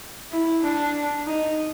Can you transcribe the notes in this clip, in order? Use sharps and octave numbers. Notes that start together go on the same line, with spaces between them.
E4
D4
D#4